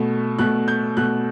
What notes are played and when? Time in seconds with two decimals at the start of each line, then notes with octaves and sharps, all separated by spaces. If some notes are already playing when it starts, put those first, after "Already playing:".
Already playing: B2 A3
0.39 B2 A3 F#6
0.68 G6
0.97 B2 A3 F#6